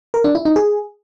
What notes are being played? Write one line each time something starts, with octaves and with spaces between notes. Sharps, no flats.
A#4
D4
E4
D#4
G#4